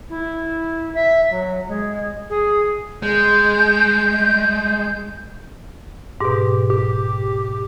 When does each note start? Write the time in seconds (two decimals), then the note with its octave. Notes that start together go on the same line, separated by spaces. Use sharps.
0.09 E4
0.94 E5
1.29 F#3
1.68 G#3
2.29 G#4
3.03 G#3 G6
6.21 G#2 B2 G4
6.70 G4